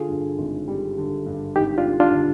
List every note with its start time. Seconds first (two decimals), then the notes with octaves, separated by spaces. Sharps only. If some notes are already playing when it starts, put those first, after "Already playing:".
Already playing: D3 F4 G#4
0.09 G2
0.38 G#1
0.68 G3
0.98 D3
1.26 G2
1.56 G#1 D#4 G4
1.78 D4 F4
1.85 G3
2.00 D4 F4
2.14 D3